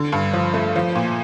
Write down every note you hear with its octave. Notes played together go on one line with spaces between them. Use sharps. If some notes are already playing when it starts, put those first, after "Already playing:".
Already playing: D3
G2
F3
A3
F3
A#2